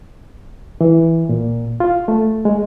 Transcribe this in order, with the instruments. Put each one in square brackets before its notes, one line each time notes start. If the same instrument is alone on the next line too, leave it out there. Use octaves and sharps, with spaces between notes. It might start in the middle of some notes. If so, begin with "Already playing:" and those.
[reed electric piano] E3
A#2
F4
A3
G#3